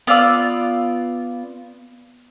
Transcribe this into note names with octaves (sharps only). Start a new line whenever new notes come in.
B3 F4 D5 E6